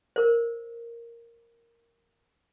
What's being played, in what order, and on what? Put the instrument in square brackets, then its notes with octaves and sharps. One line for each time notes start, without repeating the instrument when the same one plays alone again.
[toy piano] A#4 C5